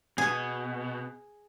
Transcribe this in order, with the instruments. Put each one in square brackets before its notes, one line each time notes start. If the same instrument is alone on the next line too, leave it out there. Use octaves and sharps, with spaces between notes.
[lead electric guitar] B2 [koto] G#4